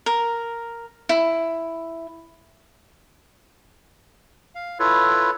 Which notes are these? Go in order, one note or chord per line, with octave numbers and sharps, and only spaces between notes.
A#4
E4
F5
E4 F4 A4 B4 C#5